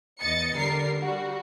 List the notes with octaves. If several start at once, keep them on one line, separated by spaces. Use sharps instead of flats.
E2 D#5 A6 C#7
D3 G3 A#4 C7
G3 F#4